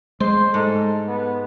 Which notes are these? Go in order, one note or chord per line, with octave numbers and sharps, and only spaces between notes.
G#3 C5 C6
G#2 A4
B3